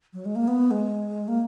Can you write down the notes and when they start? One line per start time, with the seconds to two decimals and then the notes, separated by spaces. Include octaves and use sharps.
0.13 F#3
0.25 G#3
0.36 A#3
0.48 B3
0.71 G#3
1.28 A#3